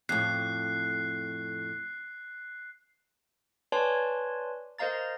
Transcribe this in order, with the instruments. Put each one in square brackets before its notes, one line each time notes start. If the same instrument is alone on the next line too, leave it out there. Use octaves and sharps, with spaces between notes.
[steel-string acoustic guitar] F2 A2 [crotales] F#6 C7
[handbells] B4 C#5 D5 G#5 A5 C6
A#4 C5 D#5 F5 A#5 A6